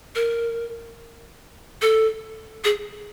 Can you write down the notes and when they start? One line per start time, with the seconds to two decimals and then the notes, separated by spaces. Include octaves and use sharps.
0.15 A#4
1.82 A4
2.65 G#4